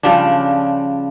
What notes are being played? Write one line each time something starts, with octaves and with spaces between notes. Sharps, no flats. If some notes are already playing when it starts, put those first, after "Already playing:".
C#3 F3 G3 D4